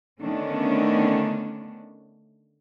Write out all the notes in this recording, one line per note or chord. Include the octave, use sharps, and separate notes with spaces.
D3 D#3 A3 B3 C#4 D4